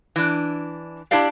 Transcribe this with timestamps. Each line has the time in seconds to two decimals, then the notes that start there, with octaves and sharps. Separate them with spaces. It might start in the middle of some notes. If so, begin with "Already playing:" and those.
0.16 E3 D4
1.11 D4 E4 G4 D5 F5